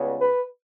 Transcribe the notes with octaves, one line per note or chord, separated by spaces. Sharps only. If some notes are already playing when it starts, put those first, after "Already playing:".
Already playing: C#2 C#3 G3 B3
B4